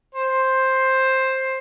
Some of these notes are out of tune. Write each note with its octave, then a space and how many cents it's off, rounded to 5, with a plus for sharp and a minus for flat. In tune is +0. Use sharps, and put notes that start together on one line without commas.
C5 +10